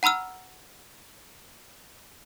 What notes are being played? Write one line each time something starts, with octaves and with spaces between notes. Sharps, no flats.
F#5 A#5 B5 E6 F6